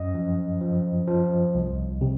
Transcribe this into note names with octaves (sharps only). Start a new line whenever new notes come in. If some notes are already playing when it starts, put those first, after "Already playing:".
Already playing: F#2 D#5
F3
F3
F3
C2
C3